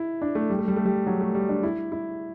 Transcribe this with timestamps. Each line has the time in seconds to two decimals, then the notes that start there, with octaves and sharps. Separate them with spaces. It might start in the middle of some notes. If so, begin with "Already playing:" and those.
Already playing: E4
0.22 D4
0.35 A3
0.50 G3
0.59 A3
0.68 G3
0.77 A3
0.85 G3
1.07 F#3
1.21 A3
1.35 G3
1.49 D4
1.63 E4
1.92 E4